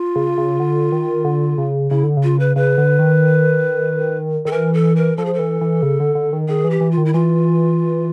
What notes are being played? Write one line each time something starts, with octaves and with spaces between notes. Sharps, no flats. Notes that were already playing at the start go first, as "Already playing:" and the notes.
Already playing: F4
C#3
C#3
D3
D#3
D3
C#3
C#3 E4
D3
C#3
F4
B4
C#3 B4
D3
D#3
D#3 A4
E3 A#4
A4
A#4
F3 A4
G#4
A4
E3
E3
C#3
D3
D3
D#3
D#3 G#4
E3
G4
E3
F4
D#3
E4
E3 F4